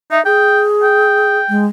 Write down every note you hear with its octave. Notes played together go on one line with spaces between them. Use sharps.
D#4 E5
G#4 G5
G5
G#3